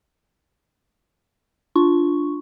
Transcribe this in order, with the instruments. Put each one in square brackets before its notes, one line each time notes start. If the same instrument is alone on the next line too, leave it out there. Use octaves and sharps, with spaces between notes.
[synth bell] D4 F4 C#6